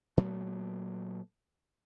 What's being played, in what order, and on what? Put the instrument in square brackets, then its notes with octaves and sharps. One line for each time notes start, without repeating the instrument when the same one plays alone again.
[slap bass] A#2 F#3 A3 B3